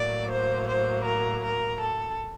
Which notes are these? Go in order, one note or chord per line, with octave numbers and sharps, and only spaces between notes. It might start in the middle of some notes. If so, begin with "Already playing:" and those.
Already playing: A2 F#3 A#3 D5
C5
C5
A#4
A#4
A4